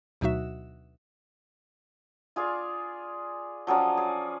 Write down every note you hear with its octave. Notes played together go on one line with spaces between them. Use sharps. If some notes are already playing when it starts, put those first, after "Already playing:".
D2 B2 F#3 D#4 F#4 E5
F4 G#4 D5
F3 F#3 C#4 D5
G#4